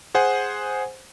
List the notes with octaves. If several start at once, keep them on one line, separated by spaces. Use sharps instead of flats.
G#4 C5 F#5 G#5